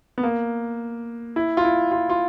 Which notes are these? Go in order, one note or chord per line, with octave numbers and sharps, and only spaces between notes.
B3
A#3
E4
F4
E4
F4
F4